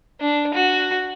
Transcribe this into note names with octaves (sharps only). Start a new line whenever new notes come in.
D4
F#4